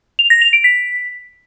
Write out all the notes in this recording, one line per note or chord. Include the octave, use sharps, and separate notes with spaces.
F7
A#6
F7
D7
B6